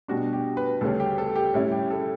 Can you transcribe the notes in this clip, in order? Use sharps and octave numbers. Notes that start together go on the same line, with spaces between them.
B2 G3 D4 F#4
G4
B4
D2 C#3 G3 C#4 A4
G4
A4
G4
A2 G3 C#4 E4
G4
A4